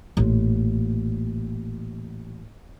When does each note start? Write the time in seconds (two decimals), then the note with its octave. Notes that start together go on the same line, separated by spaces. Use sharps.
0.17 A1 A#2